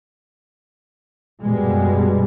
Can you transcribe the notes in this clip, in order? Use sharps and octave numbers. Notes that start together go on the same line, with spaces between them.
F#2 B2 G3 G#3